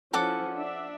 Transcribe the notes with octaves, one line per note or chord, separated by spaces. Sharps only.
F3 C#4 E4 A4 F#5 D6
D4 E5